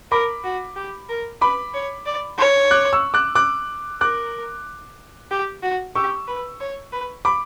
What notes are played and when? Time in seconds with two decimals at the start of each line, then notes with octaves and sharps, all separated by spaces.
0.11 A#4 B5 D6
0.44 F#4
0.76 G4
1.09 A#4
1.41 B4 B5 D6
1.74 C#5
2.06 D5
2.39 C#5
2.71 D6 F#6
2.93 C#6 E6
3.14 D6 F#6
3.35 D6 F#6
4.01 A#4 D6 F#6
5.31 G4
5.63 F#4
5.95 G4 C#6 E6
6.28 B4
6.61 C#5
6.93 B4
7.25 B5 D6